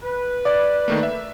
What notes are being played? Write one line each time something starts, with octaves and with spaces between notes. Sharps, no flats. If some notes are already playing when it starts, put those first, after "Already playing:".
B4
D5
D#3 A3 A#3
E5